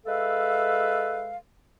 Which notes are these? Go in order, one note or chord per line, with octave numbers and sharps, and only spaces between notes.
G#3 A4 B4 E5 F5